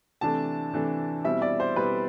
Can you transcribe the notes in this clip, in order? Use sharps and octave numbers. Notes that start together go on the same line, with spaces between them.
C3 E3 A3 D4 A5
C3 E3 A3 D4
B2 G3 C4 E4 E5
D5
C5
B2 G3 C4 E4 B4